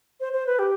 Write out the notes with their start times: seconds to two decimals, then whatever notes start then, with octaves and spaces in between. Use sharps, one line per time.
0.20 C5
0.33 C5
0.47 B4
0.59 G4